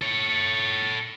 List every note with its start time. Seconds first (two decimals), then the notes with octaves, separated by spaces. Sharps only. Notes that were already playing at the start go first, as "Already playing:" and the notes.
0.01 A4 C#5